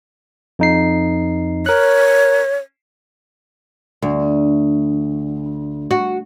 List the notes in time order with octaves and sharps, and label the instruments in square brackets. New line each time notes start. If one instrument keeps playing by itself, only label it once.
[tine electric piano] F2 D#4 C7
[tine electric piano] A#4 F#6 [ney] C#5
[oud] D2
F#4